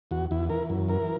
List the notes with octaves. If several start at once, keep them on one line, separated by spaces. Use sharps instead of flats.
E2 F#4
E2 E4
E3 A#4
F#2
E3 A#4